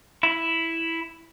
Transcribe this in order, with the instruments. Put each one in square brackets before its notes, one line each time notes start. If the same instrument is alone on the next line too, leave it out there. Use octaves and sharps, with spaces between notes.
[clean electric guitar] E4